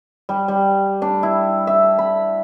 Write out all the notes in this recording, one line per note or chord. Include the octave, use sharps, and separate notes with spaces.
G3
G3
D4
E4
E5
B5